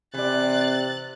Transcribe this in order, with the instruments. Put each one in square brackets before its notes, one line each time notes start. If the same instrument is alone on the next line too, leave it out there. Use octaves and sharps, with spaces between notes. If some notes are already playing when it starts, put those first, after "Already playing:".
[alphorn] C3 [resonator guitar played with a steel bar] E3 D5 [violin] F#6 A6